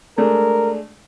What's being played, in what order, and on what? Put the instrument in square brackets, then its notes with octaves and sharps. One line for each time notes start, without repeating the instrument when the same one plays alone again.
[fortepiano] G#3 A3 D4 [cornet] A#4